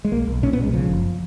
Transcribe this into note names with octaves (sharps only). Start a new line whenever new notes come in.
G#3
B1 A#3
B1
A#2 C#4
B3
B1
G#3
C#3 F3
F#1